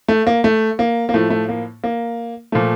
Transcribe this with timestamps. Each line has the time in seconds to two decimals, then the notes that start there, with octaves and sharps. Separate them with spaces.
0.08 A3
0.27 A#3
0.44 A3
0.79 A#3
1.09 A#3
1.14 A2 F3 A3
1.30 A3
1.49 A#3
1.84 A#3
2.52 A#2 F3 A3